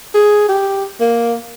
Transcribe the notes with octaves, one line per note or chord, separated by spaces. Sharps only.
G#4
G4
A#3